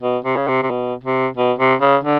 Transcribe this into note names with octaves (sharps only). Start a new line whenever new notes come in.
B2
C3
C#3
C3
C3
B2
C3
B2
C3
C#3
D3